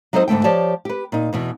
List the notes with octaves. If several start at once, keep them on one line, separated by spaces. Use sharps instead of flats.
F#3 D#4 A4 C5 D#5
D2 G#2 D3 A3 G5
F3 G4 C#5 D5 A5
G4 B4
A#2 D#4
E2 B2 E3